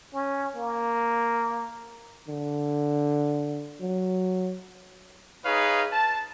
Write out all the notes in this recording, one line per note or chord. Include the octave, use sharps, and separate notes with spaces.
C#4
A#3
D3
F#3
D#4 G#4 B4 C#5 F5
A5